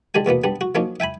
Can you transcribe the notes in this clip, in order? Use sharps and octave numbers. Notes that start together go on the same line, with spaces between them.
D3 G#3 D4 G4 G#5
E2 B2 A#3 B3
G3 B3 D4
F#4
F3 F#3 A#3 C#4 D#4
E5 G5 G#5 B5